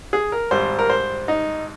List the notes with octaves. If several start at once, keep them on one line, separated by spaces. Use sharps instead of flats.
G#4
A#4
G#1 G#2 G3 C5
A#4
C5
D#4